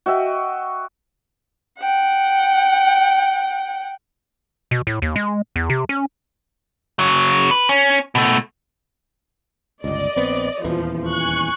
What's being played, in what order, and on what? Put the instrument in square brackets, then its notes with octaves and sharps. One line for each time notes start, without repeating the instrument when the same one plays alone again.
[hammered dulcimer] F#4 D#5 E5 G5
[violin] F#5 G5
[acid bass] B2
A2
D#2
G#3
E2
C3
C#4
[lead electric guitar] C#3 F#3
B4
C#4
B2 A3
[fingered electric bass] G1 C#2 [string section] D5 D#5
[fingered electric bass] A#1 B3 C4
[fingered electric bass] D#1 E2 E3 [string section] F3
[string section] G#5 C#6 F#6